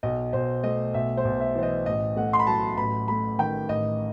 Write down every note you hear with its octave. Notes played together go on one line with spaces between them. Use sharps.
B1 D#5
B1 C5
A3 D#5
B1 E5
C5
B1
E5
E3 C5
D#5
A1 D#5
A3 F#5
C6
B5
F#3 A5
A1 B5
A3 B5
D#3 G5
A1 D#5